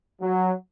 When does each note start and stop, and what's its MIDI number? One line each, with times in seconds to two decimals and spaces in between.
0.21 0.50 54